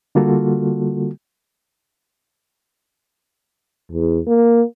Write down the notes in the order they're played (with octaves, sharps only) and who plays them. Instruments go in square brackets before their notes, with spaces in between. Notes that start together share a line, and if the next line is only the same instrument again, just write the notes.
[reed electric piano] D3 G3 A#3 F4 F#4 A4
[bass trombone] E2
A#3